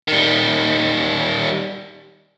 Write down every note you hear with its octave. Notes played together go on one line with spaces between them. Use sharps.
D#3 G3